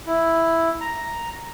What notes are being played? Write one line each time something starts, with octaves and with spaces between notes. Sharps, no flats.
E4
A#5